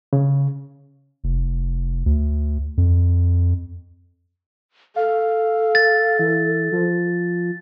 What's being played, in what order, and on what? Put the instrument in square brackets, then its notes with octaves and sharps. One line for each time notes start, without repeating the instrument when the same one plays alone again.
[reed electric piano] C#3
[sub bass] F1
D2
F2
[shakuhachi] A4 [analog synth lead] F5
[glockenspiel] A6
[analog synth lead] E3
F3